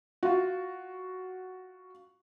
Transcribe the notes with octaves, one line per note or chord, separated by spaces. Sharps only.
F4 F#4